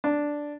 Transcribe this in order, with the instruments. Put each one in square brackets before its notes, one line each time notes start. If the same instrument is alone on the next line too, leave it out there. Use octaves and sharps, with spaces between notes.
[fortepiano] D4